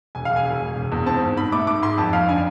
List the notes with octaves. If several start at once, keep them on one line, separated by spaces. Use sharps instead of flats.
E1 G#5
F5
E1
G#5
E1
E1
E1
E2
C4 A5
G#2
G#2 B5
A3 D6
G#2 D6
G#2 C6
F2 A5
F2 F5
D3 G#5